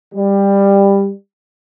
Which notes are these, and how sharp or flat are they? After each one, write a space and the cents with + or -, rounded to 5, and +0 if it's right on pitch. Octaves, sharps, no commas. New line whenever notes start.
G3 +15